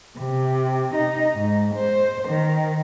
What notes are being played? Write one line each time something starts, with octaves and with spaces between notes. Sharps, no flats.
C3
D#4
G#2
C5
D#3